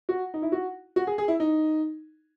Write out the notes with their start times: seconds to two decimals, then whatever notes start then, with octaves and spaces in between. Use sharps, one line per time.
0.09 F#4
0.34 D#4
0.42 E4
0.52 F#4
0.96 F#4
1.07 G#4
1.18 G#4
1.28 E4
1.40 D#4